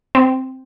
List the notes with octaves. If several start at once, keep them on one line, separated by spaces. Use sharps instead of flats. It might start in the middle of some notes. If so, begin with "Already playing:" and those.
C4